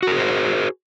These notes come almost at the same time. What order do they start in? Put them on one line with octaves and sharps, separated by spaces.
F#4 A#4 G#4 C5